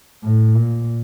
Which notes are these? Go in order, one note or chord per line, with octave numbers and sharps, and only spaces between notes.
A2
A#2